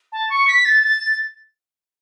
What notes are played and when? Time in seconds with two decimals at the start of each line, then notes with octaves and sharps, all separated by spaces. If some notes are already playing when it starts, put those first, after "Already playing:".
0.12 A5
0.30 C#6
0.48 B6
0.65 A6
0.83 A6